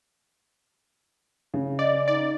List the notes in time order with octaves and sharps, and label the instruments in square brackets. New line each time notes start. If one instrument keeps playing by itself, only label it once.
[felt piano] C#3
[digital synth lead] D5 [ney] D#5
[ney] D#4 [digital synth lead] D5